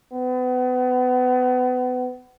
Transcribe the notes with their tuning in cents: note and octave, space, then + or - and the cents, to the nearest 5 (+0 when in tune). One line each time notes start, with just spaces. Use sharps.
B3 +30